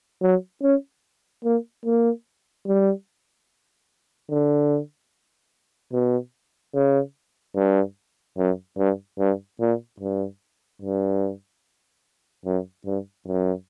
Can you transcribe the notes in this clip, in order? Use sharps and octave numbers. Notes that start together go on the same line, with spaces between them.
F#3
C#4
A#3
A#3
G3
D3
B2
C#3
G2
F#2
G2
G2
A#2
G2
G2
F#2
G2
F#2